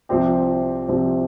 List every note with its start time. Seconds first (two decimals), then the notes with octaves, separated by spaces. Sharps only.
0.09 C2 C3 F3 C4 G4
0.88 C2 C3 F3 C4 G4